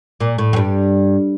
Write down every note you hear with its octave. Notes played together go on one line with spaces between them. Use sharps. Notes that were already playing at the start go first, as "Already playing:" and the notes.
A#2
A2
F2
G2